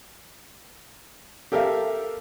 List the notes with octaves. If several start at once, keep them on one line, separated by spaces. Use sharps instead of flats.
G4 A4 A#4 E5 F5